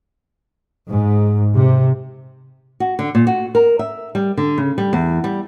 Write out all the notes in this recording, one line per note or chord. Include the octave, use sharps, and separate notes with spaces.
G#2
C3
F#4
D3
A#2
F#4
A#4
E5
G3
D3
C#3
G3
E2
G3